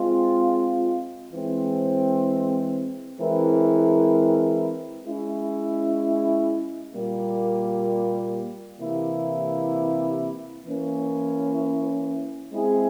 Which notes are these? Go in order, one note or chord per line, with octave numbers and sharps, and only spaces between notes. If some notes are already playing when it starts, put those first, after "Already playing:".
Already playing: G#3 C4 F4
E3 G#3 C4
E3 G#3 C4 E4 A#4
G#3 C#4 E4
A#2 G3 A#3
C3 E3 A#3 E4 G4
E3 A#3 C#4 E4
G#3 C4 E4 G#4